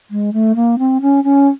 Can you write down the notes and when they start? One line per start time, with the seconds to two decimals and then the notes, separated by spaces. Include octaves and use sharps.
0.10 G#3
0.33 A3
0.55 A#3
0.78 C4
1.01 C#4
1.24 C#4